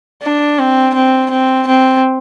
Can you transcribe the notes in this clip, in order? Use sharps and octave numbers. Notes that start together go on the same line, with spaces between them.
D4
C4
C4
C4
C4